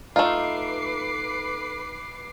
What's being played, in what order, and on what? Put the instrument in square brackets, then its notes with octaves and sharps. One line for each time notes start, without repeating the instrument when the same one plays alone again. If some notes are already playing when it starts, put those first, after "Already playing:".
[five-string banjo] A3 F4 [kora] D#4 [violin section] B4 D6 C7